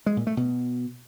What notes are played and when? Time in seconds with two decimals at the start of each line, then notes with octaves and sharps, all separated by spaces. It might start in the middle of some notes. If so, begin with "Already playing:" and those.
0.06 G#3
0.17 A#2
0.27 A3
0.37 B2